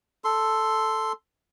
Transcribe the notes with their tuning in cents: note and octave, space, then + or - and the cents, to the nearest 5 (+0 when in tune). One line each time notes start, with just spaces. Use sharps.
A4 +0 C6 +0